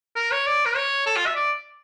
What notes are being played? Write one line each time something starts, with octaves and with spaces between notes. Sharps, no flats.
A#4
C#5
D5
A#4
C#5
A4
F4
E5
D5